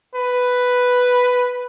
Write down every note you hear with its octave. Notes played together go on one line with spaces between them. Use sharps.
B4